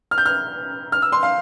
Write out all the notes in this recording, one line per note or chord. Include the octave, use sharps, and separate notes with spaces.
F6
G6
F6
F6
E6
C6
F5